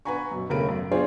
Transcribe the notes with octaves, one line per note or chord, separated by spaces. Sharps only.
B4 F#5 G#5 A#5 C#6
F#2 B2
D#2 C#3 A3 A#4 B5 D7
F#2
D4 D#4 F4 G#4 C5 C#5